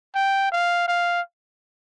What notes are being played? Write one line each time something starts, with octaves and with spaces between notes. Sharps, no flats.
G5
F5
F5